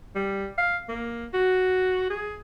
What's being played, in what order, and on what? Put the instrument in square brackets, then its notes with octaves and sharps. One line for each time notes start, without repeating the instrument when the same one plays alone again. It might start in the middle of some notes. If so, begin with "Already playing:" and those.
[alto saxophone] G3
F5
A#3
F#4
G#4